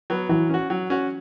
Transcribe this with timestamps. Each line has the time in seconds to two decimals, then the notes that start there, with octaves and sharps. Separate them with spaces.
0.10 F#3 B3
0.29 E3 F#3
0.50 C#4 F#4
0.70 F#3
0.90 C#4 F#4